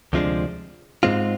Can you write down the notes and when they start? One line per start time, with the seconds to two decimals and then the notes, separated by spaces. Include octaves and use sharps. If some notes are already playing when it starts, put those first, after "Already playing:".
0.13 D2 C3 F3 G#3 D4
1.03 G#2 G#3 C4 F4